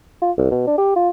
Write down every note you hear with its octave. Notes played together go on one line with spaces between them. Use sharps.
F4
C2
B2
D4
G4
F4